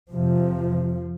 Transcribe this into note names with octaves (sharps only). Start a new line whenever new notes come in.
F2 C3 F3